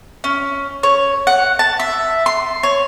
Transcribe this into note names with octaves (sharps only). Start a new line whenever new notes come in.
C#4
C#5
F#5
A5
E5
C6
C#5